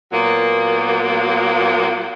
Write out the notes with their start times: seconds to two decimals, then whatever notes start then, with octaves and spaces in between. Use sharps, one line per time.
0.13 A#2 F#3 A#3 B3